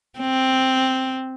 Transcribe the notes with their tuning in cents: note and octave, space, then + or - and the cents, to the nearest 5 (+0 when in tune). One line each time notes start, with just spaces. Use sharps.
C4 +0